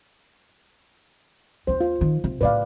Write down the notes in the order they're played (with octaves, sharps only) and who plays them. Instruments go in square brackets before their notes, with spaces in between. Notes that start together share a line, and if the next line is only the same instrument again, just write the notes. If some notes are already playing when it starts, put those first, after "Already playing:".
[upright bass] D#2 C#4 [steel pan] C5
[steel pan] F4
[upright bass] D#3
C3
[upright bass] A2 C#3 [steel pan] B4 D5 F5